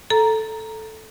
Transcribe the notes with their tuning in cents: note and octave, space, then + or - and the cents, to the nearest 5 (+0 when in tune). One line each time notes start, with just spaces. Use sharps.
A4 -5 A#5 +0